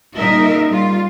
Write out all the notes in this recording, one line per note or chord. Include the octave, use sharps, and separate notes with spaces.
A#2 C#3 G3 D#4 A#4 E5
G3 F4